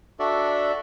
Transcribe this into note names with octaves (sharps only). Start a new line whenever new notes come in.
D4 F#4 A4 D5 E5